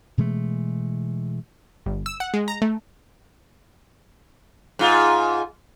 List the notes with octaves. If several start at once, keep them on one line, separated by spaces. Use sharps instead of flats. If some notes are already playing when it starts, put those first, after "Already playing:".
B2 E3 G#3 A3
G1
E6
F#5
G#3
A#5
A3
G#2 F4